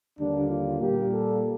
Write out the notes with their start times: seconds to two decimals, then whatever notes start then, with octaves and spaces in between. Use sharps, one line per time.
0.19 D#2 D3 G3 A#3 D4
0.49 F4
0.80 A#2 G3 A#3 G4
1.11 A4